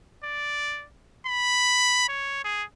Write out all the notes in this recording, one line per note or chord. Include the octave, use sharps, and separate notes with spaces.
D5
B5
C#5
G#4